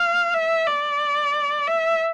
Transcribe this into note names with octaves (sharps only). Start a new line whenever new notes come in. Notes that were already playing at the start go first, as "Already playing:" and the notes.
Already playing: F5
E5
D5
E5